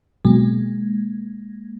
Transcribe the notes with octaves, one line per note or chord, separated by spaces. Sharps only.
B2 F#3 G#3 A#3